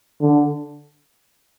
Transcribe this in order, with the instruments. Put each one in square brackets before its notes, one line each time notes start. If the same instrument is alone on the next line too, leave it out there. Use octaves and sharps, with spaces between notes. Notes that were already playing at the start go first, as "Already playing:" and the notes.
[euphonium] D3